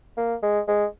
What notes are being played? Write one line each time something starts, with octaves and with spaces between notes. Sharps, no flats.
A#3
G#3
G#3